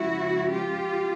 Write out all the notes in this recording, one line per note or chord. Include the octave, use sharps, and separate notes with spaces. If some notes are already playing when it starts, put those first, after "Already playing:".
Already playing: C#3 F3 G#3 E4 F#4
F4 G4